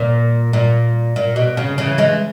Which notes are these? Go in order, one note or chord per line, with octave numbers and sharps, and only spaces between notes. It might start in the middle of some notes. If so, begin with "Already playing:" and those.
Already playing: A#2
A#2
A#2
B2
C#3
C#3 E3
E3 G#3